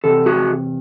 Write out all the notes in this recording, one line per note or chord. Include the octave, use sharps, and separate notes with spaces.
E2 C3 A4
F#4 G#4